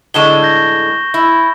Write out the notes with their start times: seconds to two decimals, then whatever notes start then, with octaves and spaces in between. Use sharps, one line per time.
0.14 A2 D3 G#3 C#6 E7 G7
0.43 G6 A#6
1.14 E4